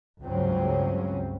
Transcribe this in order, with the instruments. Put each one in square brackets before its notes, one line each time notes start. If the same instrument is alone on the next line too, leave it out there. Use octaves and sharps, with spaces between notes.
[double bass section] C#2 G2 C#3 F#3 C4 C#4